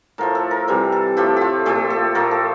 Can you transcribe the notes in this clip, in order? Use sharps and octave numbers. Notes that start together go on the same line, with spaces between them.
A2 F3 A3 A#4
A4
A#4
C3 E3 G3 A#4
A4
A2 F3 A3 G4
F4 G4
A#2 F3 A3 G4
A4
A#2 F3 A3 A#4
A4